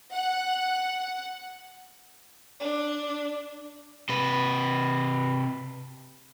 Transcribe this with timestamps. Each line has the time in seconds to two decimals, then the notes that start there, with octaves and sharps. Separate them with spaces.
0.13 F#5
2.60 D4
4.09 C3 B4